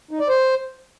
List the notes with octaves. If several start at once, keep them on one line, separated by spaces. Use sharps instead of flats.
D#4
D5
C5